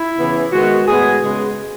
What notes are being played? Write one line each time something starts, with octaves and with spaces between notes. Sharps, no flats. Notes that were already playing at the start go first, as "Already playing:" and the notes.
Already playing: E4
C#3 E3 B3
D#3 G#3 B3 F#4
A2 G#3 B3 G#4
C#3 G#3 B3